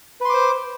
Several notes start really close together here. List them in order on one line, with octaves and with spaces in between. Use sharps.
B4 C6 D6 C5